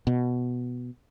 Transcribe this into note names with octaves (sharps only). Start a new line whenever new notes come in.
B2